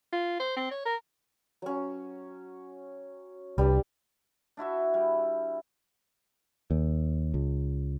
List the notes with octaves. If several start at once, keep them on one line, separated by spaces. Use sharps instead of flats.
F4
C5
C4
C#5
A#4
F#3 C#4
C2 G3 D4 B4
D4 E4 F#4 E5
G3
D#2
C#2